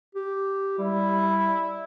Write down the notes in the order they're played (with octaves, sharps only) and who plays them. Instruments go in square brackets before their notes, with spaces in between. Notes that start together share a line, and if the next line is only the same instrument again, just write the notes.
[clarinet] G4
[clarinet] G3 [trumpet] E4